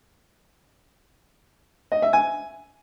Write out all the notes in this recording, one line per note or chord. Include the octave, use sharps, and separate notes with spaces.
D#5
E5
G#5